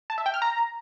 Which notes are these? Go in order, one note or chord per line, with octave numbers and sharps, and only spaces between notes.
A5
E5
G5
F6
A#5